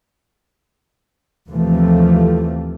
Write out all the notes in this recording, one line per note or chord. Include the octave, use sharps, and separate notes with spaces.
D#2 C3 E3 F3 A3